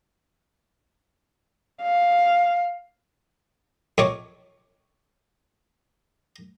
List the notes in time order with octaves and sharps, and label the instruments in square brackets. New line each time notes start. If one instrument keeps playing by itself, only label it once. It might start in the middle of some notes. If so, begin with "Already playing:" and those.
[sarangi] F5
[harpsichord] F2 C#5 D6